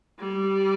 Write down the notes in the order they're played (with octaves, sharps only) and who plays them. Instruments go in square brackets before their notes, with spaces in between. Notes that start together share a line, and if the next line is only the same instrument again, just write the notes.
[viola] G3